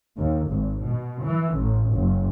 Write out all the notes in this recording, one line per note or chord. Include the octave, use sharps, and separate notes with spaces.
D#2
G#1
B2
E3
A1
F#1